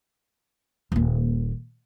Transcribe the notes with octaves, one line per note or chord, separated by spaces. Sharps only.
D#1 A#3